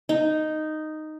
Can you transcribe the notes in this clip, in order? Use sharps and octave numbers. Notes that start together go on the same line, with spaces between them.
D#4